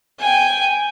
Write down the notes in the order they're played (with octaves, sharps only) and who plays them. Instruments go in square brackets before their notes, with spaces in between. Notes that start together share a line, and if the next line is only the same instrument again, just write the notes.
[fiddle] G5 G#5